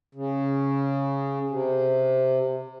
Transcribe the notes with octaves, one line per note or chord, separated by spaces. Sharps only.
C#3
C3